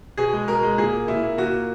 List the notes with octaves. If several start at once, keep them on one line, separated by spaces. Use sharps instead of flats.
B2 G#4
G#3
B2 A#4
G#3
A#2 G#4
A#3
A#2 E4
A#3
A#2 F#4
A#3